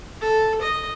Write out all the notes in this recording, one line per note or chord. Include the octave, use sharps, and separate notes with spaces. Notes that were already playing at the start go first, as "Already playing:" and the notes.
A4
D#5